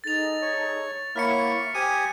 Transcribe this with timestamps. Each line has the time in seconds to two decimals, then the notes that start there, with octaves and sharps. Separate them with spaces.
0.04 D#4 G#4 A4 A6 F7
0.42 C#5
1.16 A#3 E4 C#5 F#5 C#6 F6 B6 C#7
1.75 G4 C5 G#5 D#6 D#7